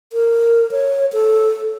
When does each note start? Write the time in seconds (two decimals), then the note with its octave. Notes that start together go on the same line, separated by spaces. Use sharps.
0.13 A#4
0.71 C#5
1.13 A4